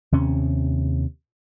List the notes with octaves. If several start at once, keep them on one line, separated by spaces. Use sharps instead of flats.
D#2 C3 C#4